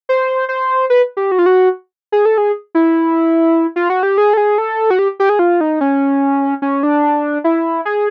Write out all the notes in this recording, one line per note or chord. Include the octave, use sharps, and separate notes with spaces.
C5
C5
B4
G4
F#4
F4
F#4
G#4
A4
G#4
E4
F4
F#4
G4
G#4
A4
G#4
A4
F#4
G4
G4
G#4
F4
D#4
C#4
C#4
D4
E4
G#4